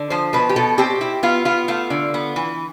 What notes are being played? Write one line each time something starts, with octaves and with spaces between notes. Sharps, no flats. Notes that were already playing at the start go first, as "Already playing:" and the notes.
Already playing: D3
F3 C5
B2 B4
G4
B2 A4
C4 G4
E4
B3 F4
B3 F4
A3 F4
D3
B3
E3